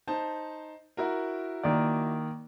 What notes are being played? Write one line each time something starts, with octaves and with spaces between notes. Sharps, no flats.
D#4 C5 A5
E4 F#4 A#4
D#3 A#3 D5